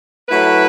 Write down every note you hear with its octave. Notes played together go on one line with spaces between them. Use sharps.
F#3 A3 E4 B4